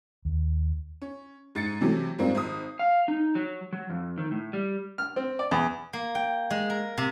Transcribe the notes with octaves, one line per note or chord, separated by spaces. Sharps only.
D#2
C#4
G#2 A6 C#7
C3 E3 F#3 A3
G#2 F3 G3 A#3 C4
G#1 D#6
F5
D#4
F#3
F#3
F2
D#3
A2
G3
F6
C4
D5
E2
A#3
G5
G#3
A#4
C3